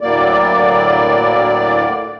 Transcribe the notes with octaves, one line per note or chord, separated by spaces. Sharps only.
D2 A2 F#3 A#3 D5